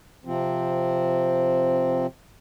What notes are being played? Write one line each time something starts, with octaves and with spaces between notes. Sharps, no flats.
C3 F3 C4